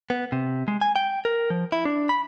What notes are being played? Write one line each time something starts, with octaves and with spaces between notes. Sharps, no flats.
B3
C3
G#3
G#5
G5
A#4
F3
E4
D4
B5